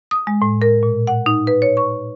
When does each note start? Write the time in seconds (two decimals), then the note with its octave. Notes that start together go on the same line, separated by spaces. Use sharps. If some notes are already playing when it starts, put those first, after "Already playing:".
0.11 D#6
0.27 G#3
0.42 A2
0.62 A#4
0.83 A#2
1.07 F#5
1.26 D#4
1.47 B4
1.62 C#5
1.77 C#6